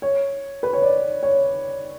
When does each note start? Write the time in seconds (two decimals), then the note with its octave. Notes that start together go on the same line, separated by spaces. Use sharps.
0.02 C#5
0.63 B4
0.73 C#5
0.82 D5
1.23 C#5